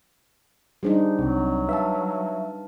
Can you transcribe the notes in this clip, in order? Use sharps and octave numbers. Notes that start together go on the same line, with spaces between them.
G3 D4 D#4 F#4 G#4 C5
C2 F#3 C4
B4 E5 F5 A5